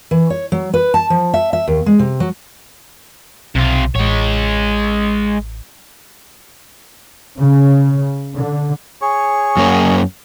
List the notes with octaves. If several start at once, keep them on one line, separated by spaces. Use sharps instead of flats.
E3
C#5
F#3
B4
A5
F3
E5
E5
D#2
G#3
C3
F#3
B1 C3 F4
A1 G#3 C#5
C#3
D3
G#4 C#5 C#6
F#2 A#3 C#4